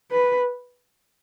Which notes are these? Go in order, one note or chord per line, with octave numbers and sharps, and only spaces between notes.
B4